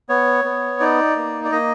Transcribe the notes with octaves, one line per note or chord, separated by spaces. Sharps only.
B3 C#5
B3
D#4 D5
A#3
D5
A#3 D#5